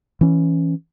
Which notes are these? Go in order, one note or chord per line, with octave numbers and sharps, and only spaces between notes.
E3 C#4